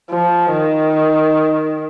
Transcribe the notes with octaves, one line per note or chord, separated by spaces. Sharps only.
F3
D#3